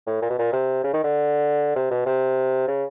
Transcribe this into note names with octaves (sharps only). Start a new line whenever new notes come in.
A2
A#2
B2
A#2
C3
C#3
D#3
D3
C3
B2
C3
C#3